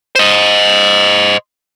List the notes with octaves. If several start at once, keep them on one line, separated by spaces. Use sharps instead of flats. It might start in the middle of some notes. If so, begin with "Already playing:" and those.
C5 D#5